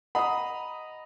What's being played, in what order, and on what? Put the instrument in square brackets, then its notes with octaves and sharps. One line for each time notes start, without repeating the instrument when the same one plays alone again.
[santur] D#5 A#5 [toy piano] F#5 [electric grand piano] B5 D#6